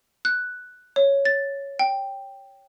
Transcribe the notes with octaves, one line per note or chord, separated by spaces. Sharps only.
F#6
C#5
A6
G5